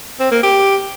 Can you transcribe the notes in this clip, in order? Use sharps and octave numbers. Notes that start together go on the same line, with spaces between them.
C4
A#3
G4